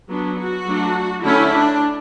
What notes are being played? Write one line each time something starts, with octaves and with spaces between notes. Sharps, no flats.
F#3 B3 D4
F#4
F#3 A3 D4
D3 A3 C#4 E4
D4